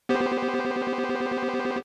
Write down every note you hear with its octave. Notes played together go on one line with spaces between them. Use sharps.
B3 G4 C5